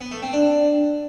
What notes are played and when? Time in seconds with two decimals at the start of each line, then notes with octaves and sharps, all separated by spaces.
0.01 B3
0.11 A3
0.22 C4
0.33 D4